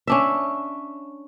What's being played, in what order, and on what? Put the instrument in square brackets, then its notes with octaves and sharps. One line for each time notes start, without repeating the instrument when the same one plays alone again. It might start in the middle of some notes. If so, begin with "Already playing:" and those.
[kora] C#4 D4 E5